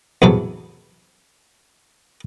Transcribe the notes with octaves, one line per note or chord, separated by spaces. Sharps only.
E2 A2 C3 F#3 A4